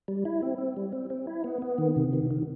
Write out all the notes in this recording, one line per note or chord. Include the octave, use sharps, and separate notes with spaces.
G3
E4
C4
C4
G3
C4
C4
E4
B3
B3
D#3
C3
D#3
D#3